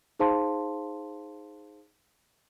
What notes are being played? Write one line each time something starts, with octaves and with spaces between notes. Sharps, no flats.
D#4 G#4 C5 F5 A5 C6